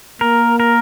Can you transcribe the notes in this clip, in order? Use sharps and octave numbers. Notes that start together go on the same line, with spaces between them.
A#3 A#4
A#4